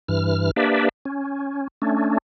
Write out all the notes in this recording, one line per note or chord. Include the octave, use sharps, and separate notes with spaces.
G2 E3 F6
A#3 D4 G4 B4 D5 E5
C#4
A3 C#4 D4